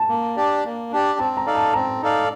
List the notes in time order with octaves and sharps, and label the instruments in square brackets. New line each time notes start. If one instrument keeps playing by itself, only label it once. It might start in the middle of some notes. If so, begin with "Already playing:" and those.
Already playing: [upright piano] A5
[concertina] A#3
D4 G4 D5
A#3
D4 G4 D5
[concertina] C4 [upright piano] A5
[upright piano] A#5
[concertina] D#4 A4 D5 F5
[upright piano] A5
[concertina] C4 [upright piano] A#5
[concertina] D#4 A4 D5 F5